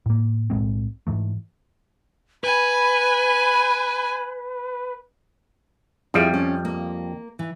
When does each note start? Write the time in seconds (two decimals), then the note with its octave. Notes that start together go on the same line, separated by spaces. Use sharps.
0.06 A2 A#3
0.50 B1 A2 G#3 C4
1.07 G#2 E3 A3
2.44 B4 G#5 B5
6.14 F2 F3 G3 E4 G#4 E5
6.34 C#4
6.65 A#3
7.39 E3